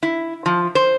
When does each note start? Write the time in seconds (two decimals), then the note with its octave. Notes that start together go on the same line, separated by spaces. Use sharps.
0.03 E4
0.46 F3
0.75 C5